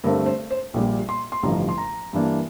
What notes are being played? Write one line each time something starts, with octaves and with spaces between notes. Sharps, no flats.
G2 D3 A3 C4 A#4
C5
C5
A#1 A#2 G3
C6
C6
A1 G2 D3 F3 A#5
C6
A#5
G2 E3 A#3 D4